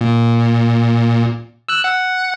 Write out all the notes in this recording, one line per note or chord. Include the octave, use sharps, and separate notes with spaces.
A#2
E6 F#6
F#5